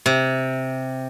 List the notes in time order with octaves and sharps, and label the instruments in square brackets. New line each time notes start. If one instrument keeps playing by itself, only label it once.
[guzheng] C3